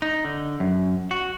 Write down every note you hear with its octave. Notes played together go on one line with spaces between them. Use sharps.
D#4
D3
F#2
F#4